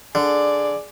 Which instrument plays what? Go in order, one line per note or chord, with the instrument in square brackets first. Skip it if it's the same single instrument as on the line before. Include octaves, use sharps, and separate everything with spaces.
[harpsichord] D3 [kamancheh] G#4 D5